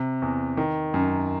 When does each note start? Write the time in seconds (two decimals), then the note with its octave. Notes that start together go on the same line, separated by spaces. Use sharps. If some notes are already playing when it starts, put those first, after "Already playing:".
Already playing: C3
0.22 E2
0.57 D#3
0.94 F#2